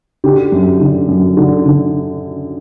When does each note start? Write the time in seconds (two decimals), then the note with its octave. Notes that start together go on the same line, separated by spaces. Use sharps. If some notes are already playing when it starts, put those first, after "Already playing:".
0.24 D3 G4
0.52 F#2
0.80 D3
1.08 F#2
1.37 D3
1.65 D3